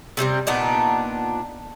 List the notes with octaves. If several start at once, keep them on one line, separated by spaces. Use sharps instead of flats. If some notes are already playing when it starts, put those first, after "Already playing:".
C3 G3 A3 C4
A#2 B3 D4 D#4